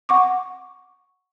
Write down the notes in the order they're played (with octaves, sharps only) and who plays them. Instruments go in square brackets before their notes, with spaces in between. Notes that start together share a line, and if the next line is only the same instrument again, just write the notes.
[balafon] F#5 C#6 D6